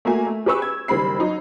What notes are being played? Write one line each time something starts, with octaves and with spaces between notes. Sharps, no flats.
A3 A#3 F#4 G#5
A3
G4 G#4 B4 C#6 E6
G#6
F#1 D#3 G3 C5 B5 C7
F#3 D#4